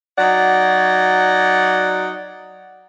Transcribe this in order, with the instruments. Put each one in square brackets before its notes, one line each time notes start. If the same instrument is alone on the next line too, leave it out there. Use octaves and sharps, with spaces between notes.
[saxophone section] F#3 D#4 D5 F#5